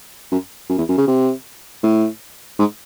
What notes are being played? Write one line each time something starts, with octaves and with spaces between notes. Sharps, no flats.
F#2
F#2
E2
F#2
C#3
C3
A2
G#2